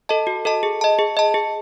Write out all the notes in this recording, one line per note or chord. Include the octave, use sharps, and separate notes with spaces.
A4 D#5 A5
F#4
A4 D#5 A5
G#4
D#5 A5
G#4
D#5 A5
G#4